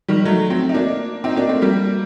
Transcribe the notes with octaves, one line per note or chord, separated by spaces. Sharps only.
D#3 G3
F#3 A3
A3 C4
D#4
A#3 D4
C4 D#4
A#3 D4
A3 C4
G3 A#3